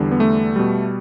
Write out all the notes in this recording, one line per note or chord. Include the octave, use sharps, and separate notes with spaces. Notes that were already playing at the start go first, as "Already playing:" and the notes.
Already playing: E2 D3 G3
B3
A3
B2 G3